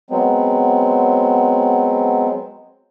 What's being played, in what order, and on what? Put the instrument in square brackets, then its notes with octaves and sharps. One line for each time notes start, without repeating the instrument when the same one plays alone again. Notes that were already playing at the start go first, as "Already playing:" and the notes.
[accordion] F#3 G#3 B3 C4